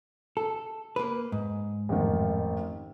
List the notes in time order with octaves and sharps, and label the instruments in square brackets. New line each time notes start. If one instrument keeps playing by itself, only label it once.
[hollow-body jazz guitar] A4
A#3 B4
G#2
[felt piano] A1 F2 D#3